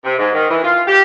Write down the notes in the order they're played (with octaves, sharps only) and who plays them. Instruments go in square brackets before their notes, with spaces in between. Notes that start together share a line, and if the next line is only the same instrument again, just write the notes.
[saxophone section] C3
G#2
D#3
E3
F4
G4